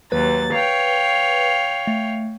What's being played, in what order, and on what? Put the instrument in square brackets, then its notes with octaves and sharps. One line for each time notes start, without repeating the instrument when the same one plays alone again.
[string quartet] D#2 F#3 A6 [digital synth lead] B4
[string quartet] C#5 F5 G5
[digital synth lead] A3